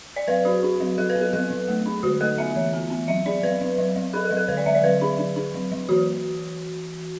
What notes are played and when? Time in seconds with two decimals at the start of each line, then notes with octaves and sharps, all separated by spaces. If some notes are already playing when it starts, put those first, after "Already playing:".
0.16 D5
0.28 F#3 B4
0.45 D4 F#4
0.63 D4
0.80 F#3
0.98 F#3 A4
1.09 B4
1.16 B3
1.21 A4
1.33 F#3 A4
1.50 F#3
1.68 A3
1.86 D4
2.03 D3 F#4
2.21 A3 A4
2.38 B3 E5
2.56 E3
2.73 B3
2.90 B3
3.08 F#3 E5
3.26 D4 D5
3.43 F#3 B4
3.61 F#3
3.78 F#3
3.96 F#3
4.13 D4 A4
4.25 A4
4.31 F#3
4.37 A4
4.48 D3 B4
4.57 D5
4.66 D3 E5
4.75 D5
4.83 F#3 B4
5.01 D4
5.19 D4
5.36 D4
5.54 F#3
5.71 F#3
5.89 E3 F#4